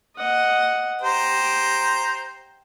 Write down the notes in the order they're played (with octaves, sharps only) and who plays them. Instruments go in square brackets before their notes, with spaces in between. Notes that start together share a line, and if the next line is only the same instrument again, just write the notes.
[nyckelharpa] D#5 F#5
[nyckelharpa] G4 G5 [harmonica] C5 A#5